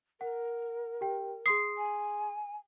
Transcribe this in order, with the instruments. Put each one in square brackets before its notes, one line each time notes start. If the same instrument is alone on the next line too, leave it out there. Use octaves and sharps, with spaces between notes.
[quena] A#4 [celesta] F#5
[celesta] G4 G5
[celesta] G#4 C6 D#6 [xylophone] C7
[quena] G#5